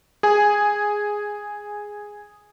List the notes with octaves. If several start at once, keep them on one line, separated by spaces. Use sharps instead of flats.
G#4 G#5